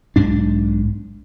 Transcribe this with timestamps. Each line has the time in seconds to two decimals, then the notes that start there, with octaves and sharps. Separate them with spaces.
0.16 B1 G#2 D4